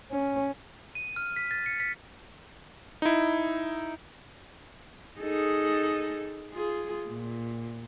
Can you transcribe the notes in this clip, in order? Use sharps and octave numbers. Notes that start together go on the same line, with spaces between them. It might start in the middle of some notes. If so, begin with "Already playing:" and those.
C#4
D#7
F6
B6
A6
C#7
B6
D#4 E4
D#4 G#4 A4
F4 G#4
A#2